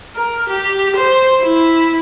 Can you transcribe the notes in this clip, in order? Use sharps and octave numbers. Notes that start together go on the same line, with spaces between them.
A#4
G4
C5
E4